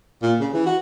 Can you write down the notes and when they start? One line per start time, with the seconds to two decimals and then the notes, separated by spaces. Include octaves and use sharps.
0.22 A#2
0.40 C#3
0.53 E3
0.66 F#4